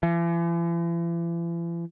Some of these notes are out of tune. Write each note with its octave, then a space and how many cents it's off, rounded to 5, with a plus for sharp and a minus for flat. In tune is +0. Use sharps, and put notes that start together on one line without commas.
E3 +45